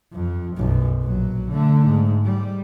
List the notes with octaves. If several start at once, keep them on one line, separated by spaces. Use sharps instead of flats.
F2
B1 F#2
A#1 F#3
D3 A3
G#2
G3